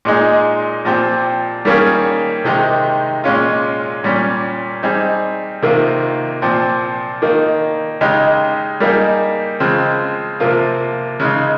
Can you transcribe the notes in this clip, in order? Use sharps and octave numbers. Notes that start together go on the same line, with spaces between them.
A#2 G#3 D#4 G#4
A#2 F3 C4 G4
D#3 G3 A#3 C#4 G#4
C3 D#3 G#3 D#4 G4
A#2 G#3 C#4 F4
A#2 G3 C#4
G3 C4 D#4 G#4
C3 D#3 A#3 F4
A#2 F3 C4
D#3 A#3 D#4
C#3 G#3 D#4 G4
G3 A#3 D#4 G#4
C#3 F3 G#3 C4
C3 F3 A#3 F4
C#3 G#3 D#4